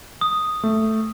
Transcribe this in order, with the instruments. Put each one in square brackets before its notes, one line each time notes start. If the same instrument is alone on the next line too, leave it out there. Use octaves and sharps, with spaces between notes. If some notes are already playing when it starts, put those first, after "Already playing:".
[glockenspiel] D#6
[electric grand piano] A3